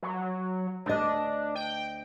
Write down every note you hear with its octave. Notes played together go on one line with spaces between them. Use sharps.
F#3
D2 D4 D#5
G5